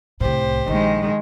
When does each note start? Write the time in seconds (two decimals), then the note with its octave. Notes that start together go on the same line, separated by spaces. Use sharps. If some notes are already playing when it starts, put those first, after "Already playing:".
0.20 C2 A2 G4 C5
0.68 A#1 D#3 G#3